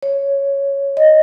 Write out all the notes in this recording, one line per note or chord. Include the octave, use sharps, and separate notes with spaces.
C#5
D#5